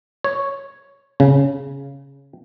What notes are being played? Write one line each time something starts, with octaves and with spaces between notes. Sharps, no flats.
C#5
C#3